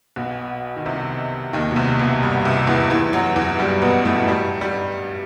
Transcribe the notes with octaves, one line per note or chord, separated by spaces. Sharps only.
B1 B2
D#3
C2 C3
D#2 D#3
B2
C2 C3
B1 B2
G2
C2 C3
E2 E3
E2 E3
F#2 F#3
E2 E3
G2 G3
B2 B3
A2 A3
G2 G3
G2 G3